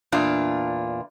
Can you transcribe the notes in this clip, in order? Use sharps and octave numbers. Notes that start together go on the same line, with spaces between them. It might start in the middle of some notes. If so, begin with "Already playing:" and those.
E2 A#2 D4 F4